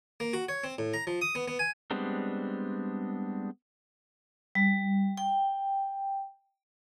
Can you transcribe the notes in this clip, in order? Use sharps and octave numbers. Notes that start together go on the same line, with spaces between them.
A#3
F#4
C#5
C4
A2
A#5
F3
D#6
B3
B3
G#5
G3 G#3 B3 C4 D4
G3
G5